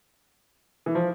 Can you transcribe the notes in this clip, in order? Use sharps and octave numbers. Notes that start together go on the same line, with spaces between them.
E3
F3